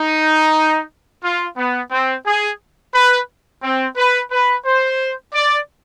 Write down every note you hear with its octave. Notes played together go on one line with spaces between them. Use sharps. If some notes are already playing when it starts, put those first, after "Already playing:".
Already playing: D#4
F4
B3
C4
G#4
B4
C4
B4
B4
C5
D5